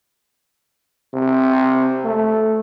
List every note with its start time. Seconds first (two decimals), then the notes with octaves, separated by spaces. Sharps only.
1.14 C3
2.05 A3